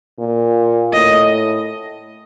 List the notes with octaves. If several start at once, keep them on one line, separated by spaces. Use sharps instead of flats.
A#2
A2 D#5